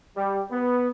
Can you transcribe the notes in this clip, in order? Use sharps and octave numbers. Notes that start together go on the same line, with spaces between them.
G3
B3